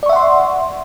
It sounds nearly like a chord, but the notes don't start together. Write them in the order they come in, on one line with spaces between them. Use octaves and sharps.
D5 C#6 E5 F#5 C6